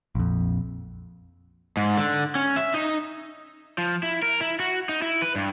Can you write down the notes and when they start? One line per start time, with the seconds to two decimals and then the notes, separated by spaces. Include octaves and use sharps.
0.15 A#1 F2
1.77 G#2
1.98 D3
2.35 C#4
2.56 E5
2.74 D#4
3.78 F3
4.03 E4
4.23 A#4
4.41 E4
4.60 F#4
4.89 D#4
5.02 E4
5.22 B4
5.36 G2